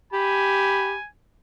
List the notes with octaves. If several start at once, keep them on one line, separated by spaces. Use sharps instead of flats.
G4 G#5 B5